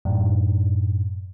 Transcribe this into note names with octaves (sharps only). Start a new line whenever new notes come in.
F#2 A2